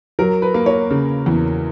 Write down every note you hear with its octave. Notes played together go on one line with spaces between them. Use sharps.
F#3 A#4
B4
A#3
C#5
C#3
E2